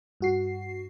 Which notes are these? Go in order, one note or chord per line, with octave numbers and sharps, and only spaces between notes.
G2 F#4 C7